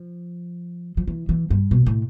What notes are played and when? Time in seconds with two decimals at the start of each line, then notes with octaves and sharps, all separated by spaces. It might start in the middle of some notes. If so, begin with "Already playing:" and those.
Already playing: F3
0.97 F3
1.07 E3
1.29 E3
1.50 G2
1.71 B2
1.86 A2